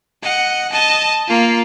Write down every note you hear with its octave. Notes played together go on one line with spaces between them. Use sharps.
D#5 F#5
D#5 A5
A#3 F4